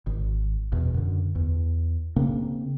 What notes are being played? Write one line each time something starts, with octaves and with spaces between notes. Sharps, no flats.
G#1
D#1 E2 B2
F#2 D3
E2
C#3 A#3 C4 D4